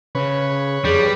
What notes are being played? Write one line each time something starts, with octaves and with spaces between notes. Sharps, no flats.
C#3 B4 C#5
F2 G3 G#4